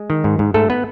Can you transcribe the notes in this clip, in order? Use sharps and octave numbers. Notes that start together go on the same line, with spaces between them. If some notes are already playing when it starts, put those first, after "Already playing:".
Already playing: G#3
D#3
G#2
G#2
G#2 A3 A4
B3 B4